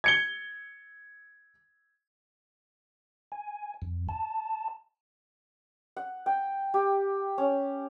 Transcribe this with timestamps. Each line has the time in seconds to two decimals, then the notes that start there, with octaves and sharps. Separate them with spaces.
0.04 G#6 C#7 G7
3.32 G#5
3.82 F2
4.09 A5
5.97 F#5
6.26 G5
6.74 G4
7.38 C#4